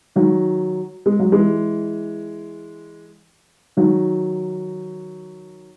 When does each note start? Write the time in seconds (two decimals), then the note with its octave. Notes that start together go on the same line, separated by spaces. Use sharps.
0.16 D#3 F#3
1.06 G#3
1.20 F#3
1.32 E3 G#3
3.77 D#3 F#3